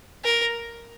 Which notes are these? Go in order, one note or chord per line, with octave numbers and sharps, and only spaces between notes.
A#4